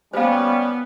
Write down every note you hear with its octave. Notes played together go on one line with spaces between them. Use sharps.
G3 B3 C#4 C5 F5